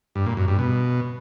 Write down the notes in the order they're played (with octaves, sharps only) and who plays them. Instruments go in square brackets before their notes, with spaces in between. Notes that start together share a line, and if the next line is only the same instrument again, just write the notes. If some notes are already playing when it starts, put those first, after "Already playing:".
[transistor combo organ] G2
A#2
F#2
G2
B2